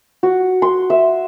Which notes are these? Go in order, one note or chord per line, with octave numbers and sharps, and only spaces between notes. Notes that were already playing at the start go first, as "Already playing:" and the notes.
F#4
C6
E5